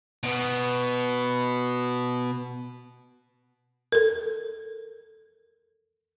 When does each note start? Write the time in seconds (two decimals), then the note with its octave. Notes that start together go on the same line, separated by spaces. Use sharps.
0.23 B2 B3
3.92 A4 A#4